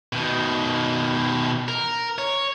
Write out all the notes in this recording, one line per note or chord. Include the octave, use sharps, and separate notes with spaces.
B2 D#3
A#4
C#5